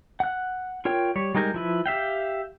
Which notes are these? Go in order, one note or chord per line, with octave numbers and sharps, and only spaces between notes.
F#5 F#6
F4 A#4 C#5 G5
G3 C#5
G3 G#3 D#4 A#4 G6
F3 E4 B4
G4 E5 F5 G5